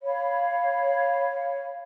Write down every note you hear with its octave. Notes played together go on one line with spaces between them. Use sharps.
C#5 F5 B5